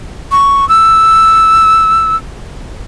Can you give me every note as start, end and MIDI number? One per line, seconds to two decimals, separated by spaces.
0.32 0.67 85
0.69 2.16 88